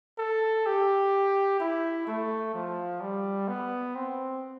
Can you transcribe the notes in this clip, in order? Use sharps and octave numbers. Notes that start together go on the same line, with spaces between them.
A4
G4
E4
A3
F3
G3
B3
C4